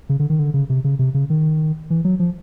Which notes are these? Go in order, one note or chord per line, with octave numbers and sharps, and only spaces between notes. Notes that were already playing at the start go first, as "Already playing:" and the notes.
C#3
D3
D#3
D3
C#3
C3
C#3
C3
C#3
D#3
E3
F#3
F3